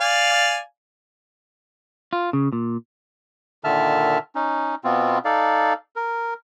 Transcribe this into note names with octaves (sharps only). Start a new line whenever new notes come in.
D5 F5 G#5
F4
C#3
A#2
A#2 D3 D#3 E5 A5 F6
C#4 D#4
B2 B3 C4 F4
D#4 A4 D5 F5
A#4